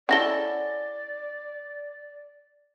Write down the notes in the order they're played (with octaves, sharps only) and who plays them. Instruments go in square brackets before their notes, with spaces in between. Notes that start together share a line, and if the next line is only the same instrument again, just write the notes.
[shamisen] C#4 E4 A4 [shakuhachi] D5 [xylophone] F#5 A#6 G7